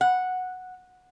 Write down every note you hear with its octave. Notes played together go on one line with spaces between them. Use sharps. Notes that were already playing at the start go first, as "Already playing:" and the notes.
F#5